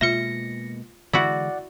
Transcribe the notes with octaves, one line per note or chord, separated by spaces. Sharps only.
B2 G#3 A#3 F4 E5 A#6 C#7
D3 E3 G#3 E4 F#4 D5 F#5